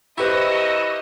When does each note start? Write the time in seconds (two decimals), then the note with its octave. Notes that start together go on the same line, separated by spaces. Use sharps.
0.18 E4 G4 B4 C5 D#5 A#5 C#6 E6